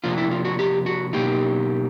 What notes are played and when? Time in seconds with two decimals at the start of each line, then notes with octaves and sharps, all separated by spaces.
0.04 C3 F3 A#3 D4 F4
0.17 E4
0.31 F4
0.45 F#4
0.59 G4
0.86 F#4
1.13 B2 F#3 A#3 D#4 G4